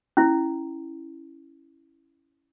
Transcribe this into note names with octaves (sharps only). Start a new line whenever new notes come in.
C#4 E4